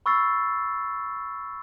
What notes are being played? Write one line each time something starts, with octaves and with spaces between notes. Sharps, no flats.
B5 C#6 E6 F6 A6 C7